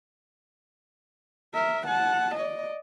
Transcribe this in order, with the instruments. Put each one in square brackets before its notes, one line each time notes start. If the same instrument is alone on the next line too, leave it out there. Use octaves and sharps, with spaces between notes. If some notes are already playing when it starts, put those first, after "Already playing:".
[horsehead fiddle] A#4 E5
F#5 A5
D5 D#5